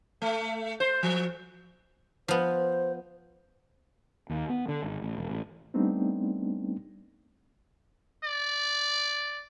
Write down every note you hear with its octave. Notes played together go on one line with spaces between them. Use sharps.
A3
C5
F3
F3 B3 C5
D#2
B3
D3
G#1
A1
E1
A1
G3 A3 B3 C4 D4 D#4
D5